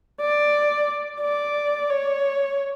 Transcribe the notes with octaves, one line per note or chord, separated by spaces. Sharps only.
D5
D5
C#5